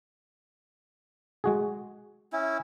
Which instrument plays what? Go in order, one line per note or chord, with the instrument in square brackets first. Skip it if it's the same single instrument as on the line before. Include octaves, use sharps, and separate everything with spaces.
[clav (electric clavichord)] G#3 F#4 G#4
[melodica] C#4 E4